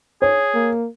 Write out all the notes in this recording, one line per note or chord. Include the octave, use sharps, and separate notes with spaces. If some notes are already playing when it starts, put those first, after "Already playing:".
G#4 C#5
A#3